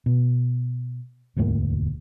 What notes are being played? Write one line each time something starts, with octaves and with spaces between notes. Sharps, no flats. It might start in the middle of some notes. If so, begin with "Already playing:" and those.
B2
E1 D2 G#2 A#3